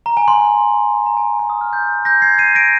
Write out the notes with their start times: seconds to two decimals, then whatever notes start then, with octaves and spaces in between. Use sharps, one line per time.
0.06 A#5
0.17 G#5
0.28 C6
1.06 A#5
1.17 G#5
1.39 C6
1.50 D#6
1.61 F6
1.73 G6
2.05 G6 A#6
2.22 G#6 C7
2.38 C7 D#7
2.55 A#6 D7